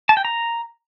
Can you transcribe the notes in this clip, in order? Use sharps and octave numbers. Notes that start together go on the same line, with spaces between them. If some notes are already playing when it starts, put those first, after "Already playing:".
A5
G5
A#5